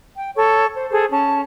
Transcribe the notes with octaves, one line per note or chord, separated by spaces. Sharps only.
G5
A4 C#5 C#6
C5
G#4 A4 C5
C#4 A5 C#6